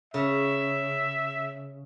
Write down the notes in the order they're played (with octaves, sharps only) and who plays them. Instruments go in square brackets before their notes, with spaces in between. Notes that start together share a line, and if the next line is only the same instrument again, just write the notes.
[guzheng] C#3 [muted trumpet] E5